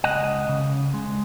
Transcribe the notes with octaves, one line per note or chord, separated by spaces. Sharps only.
C#2 D#5 F#5
C#3
G#3